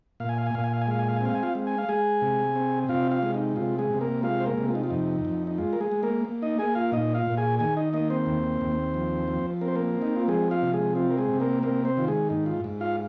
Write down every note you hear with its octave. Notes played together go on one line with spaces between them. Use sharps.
A#2 F5
G#5
F5
G#5
A#2 F5
G#5
F5
G#5
G#3 F5
G#5
F5
G#5
C4 F5
G#5
F4 F5
G#3
G#5
F5
G#3 G#4 G#5
C3
C4
C3 F4 F5
F4 F5
G#3
D#4
C3 F4
G#3 G#4
C3
A#3 A#4
G#3 F4 F5
C5
A#3 A#4
C3
F4
D#4
F4
F2 D#4
F2
D#4
G#3 F4
A#4
G#3 G#4
G#3
A#3 A#4
A#3
D#4 D#5
A#3 G#4 G#5
F4 F5
A#2 D#4 D#5
F4 F5
A#2
G#4 G#5
D#3 G#4 G#5
D#4 D#5
A#3 D#4 D#5
C4 C5
D#2
D#2
F3
F3
C4 A#4
C5
A#3 A#4
C4
D#4
F4
F3 G#3 G#4
F4 F5
C3
G#3 G#4
C4 F4
A#4
G#3 G#4
C3
A#3 A#4
A#3 C4 A#4
C4 C5
D#3 F4
G#3 G#4
G#2 D#4
F4
G#2
F4 F5